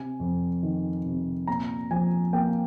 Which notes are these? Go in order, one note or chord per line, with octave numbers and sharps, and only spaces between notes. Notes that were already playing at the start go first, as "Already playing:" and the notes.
Already playing: C3 G#5
F2
D#3
C3
A#2 A#5
F3 G#5
A#3 G5